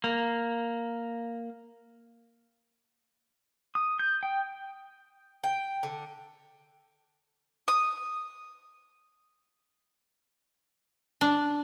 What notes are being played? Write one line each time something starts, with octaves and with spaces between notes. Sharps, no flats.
A#3
D#6
G6
G5
G5
D3
D#6
D4